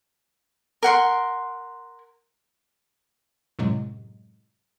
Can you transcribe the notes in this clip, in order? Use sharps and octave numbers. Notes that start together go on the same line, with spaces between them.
A#4 F#5 C6
F#2 A2 C3 F#3 G#3